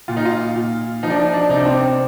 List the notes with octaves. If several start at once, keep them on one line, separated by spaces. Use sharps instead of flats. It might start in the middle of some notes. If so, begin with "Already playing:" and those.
A#2 F4
D#4
F4
A#2
F3 D#4
D4
D#4
D4
C3 D#4
D4
C4